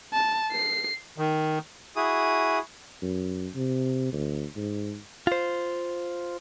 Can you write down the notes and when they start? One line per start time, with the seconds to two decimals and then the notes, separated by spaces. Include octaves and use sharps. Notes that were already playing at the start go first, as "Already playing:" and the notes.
0.13 A5
0.52 C7
1.18 D#3
1.96 E4 F#4 G#4 D#6
3.02 F#2
3.55 C3
4.13 D2
4.56 G#2
5.27 F4 C5